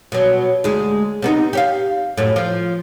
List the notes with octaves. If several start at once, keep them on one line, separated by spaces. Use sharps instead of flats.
B2 F#3
D2 G#3
C3 B3 D#4
G4 C#5 F5
F#2 A2
F3